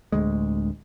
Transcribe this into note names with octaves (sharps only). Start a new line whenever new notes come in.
D1 G1 D2 G#3